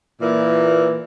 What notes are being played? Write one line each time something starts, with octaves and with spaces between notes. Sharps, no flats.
A#2 E3